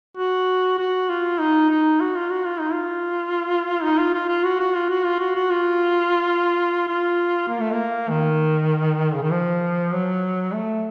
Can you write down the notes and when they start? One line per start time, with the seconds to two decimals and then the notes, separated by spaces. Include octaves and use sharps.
0.17 F#4
0.78 F#4
1.09 F4
1.39 D#4
1.70 D#4
2.00 F#4
2.16 F4
2.30 F#4
2.46 F4
2.59 D#4
2.73 F4
3.82 D#4
3.98 F4
4.14 F4
4.28 F4
4.44 F#4
4.59 F#4
4.75 F4
4.90 F#4
5.05 F4
5.20 F#4
5.35 F#4
5.50 F4
6.88 F4
7.48 A#3
7.60 A3
7.72 A#3
8.09 D#3
9.14 C#3
9.23 D#3
9.31 F3
9.92 F#3
10.53 A3